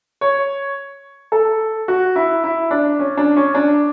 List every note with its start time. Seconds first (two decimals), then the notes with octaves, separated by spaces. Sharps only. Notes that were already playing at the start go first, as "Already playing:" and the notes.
0.21 C#5
1.32 A4
1.88 F#4
2.16 E4
2.44 E4
2.71 D4
2.99 C#4
3.17 D4
3.36 C#4
3.55 D4